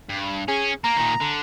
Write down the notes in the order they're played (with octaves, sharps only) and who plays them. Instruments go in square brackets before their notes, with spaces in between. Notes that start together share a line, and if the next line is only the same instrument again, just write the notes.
[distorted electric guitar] G2
[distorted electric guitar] C#4 [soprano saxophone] G#4
[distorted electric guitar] A#3 [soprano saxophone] A#5
[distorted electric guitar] A#2 D#3
D3